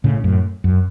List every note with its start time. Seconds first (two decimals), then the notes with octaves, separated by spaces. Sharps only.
0.04 A2 C#3
0.24 F#2 A2
0.64 F#2